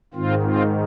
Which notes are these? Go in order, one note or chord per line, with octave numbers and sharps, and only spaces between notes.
G#2 D#3 C4 F4
C4 F4